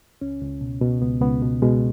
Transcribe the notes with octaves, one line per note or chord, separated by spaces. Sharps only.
C#2 C#4
C#2
B2
B2
C#2 B3
C#2 B3
B2
B2 G#3